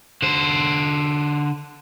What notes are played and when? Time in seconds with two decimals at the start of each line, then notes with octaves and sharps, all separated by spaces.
0.22 D3 C5